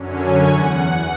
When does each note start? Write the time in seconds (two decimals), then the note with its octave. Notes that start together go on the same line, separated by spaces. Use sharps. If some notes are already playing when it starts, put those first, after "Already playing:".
Already playing: F#2 D3 F#3 C#4
0.19 G#5
0.47 E2 F#5